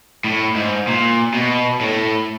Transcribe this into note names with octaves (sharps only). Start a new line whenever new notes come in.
A2
G#2
A#2
B2
A2